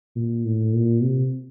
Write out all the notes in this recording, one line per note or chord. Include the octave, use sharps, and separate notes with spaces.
A#2
A2
A#2
C3